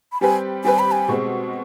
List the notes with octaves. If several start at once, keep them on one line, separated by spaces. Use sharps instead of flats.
B5
G3 C4 G4 B4 G#5
G3 C4 G4 B4 G#5
B5
G#5
B2 G#3 C4